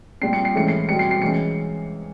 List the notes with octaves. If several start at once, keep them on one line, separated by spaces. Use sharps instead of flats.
A#2 G3 C4 C7
C#7
C7
G#2 E3 A3 C#4 E4 C#7
C7
B2 G3 C4 C#7
C7
C7
E3 G#3 C#4 C#7